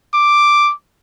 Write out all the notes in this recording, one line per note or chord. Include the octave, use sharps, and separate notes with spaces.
D6